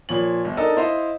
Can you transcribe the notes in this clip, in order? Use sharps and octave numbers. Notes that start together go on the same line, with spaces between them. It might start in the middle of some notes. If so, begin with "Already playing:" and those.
A#2 F3 C#5 F#7
G1
D4 D#4 A4 A#4 D#5
E4 C5 D#5 F5